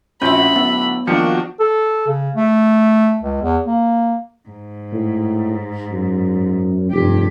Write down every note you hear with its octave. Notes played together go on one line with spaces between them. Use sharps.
A#1 A2 C4 C#4 F#4 E5 B5 G6
A2 D3 F#3 B3 F#5
D#3 F3 A#3 D4 F#4 C#7
A4
C#3
A3
C#2
E2
A#3
G#2
A2
F#2
F1 G2 G4